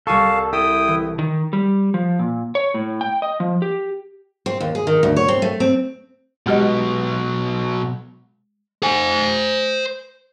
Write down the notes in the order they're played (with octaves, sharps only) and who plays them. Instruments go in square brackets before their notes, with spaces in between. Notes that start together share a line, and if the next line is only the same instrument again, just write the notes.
[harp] C2 G#5 C#6 [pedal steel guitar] A4 [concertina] F5 A5
[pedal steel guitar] E4 [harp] A4 [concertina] G5 D#6
[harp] E3
[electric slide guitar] D#3
G3
F3
A#2
C#5
A2
G5
D#5
F3
G4
[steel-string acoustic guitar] C4
D#2
G#4
D#3
D2
C#5
C4
A3
C4
[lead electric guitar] B2 F#3 [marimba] G#3 G4 D#5
[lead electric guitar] C5 G#5